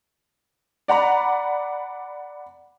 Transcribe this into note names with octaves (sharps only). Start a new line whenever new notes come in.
D5 F#5 A#5 B5